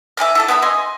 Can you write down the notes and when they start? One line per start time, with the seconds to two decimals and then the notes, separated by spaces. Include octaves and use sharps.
0.17 E5 G#5 D6 F6
0.35 E4 A4 A5
0.48 B3 E5 G#5 B5
0.62 D#5 G#5 C6